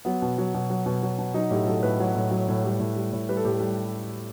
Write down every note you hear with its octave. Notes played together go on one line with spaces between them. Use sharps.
F#3 B3
B2
F#3
B2
F#3
B2
F#3
B2
F#3 D#4
A2 G4
F#3 A4
A2 B4
F#3
A2
F#3
A2
G3
A2
G3
A2
G3 B4
A4
A2 G4
A4
G3